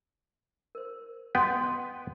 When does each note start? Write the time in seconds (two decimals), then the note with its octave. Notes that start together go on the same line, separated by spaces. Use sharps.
0.75 A#4 C5
1.35 B3 F#4 B4 D#5 G5 C6